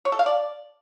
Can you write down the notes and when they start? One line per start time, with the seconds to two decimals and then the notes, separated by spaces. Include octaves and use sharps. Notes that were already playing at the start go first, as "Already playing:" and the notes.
0.05 C#5
0.12 A4
0.19 F5
0.26 D5